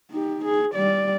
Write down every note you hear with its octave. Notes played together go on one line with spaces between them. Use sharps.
D#4 G4
G#4
G3 D5